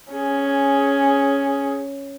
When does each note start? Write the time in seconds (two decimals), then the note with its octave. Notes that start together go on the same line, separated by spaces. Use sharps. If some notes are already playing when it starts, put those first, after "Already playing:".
0.12 C#4 G#4